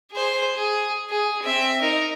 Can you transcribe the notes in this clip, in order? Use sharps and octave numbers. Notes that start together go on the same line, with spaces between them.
G#4 C5
G#4
G#4
C4 E5
D#4 A#4